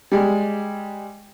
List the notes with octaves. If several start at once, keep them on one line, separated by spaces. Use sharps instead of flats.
G3 G#3